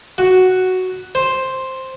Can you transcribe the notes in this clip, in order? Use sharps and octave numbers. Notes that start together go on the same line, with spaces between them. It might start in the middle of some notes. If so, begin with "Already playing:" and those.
F#4
C5